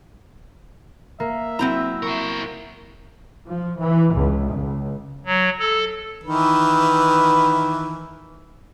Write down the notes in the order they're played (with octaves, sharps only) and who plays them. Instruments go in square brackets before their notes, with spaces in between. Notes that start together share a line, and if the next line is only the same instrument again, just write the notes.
[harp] A#3 [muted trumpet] E5
[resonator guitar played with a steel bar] F#3 C4 A#5 [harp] E4 D#7
[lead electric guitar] E4 A#4 [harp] C#6
[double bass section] F3
E3
C#2
C#2
[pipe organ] F#3
A4
[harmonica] D#3 E3 B4